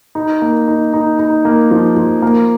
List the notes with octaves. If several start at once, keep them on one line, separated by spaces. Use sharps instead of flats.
D#4
A#3
D#4
D#4
D#4
A#3
F3
F3
A#3